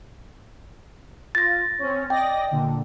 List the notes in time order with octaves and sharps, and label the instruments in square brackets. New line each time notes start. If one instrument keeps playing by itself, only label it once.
[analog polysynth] F4 [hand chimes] A6 A#6
[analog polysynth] C4 C#4
[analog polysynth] D5 D#5 A#6 [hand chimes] G5
[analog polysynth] A#2 D3